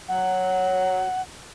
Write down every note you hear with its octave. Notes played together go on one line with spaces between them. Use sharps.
F#3 F#5